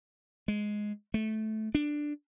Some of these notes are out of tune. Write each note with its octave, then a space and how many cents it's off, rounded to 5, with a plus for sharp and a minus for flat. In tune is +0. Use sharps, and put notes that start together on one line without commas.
G#3 +5
A3 -15
D4 +5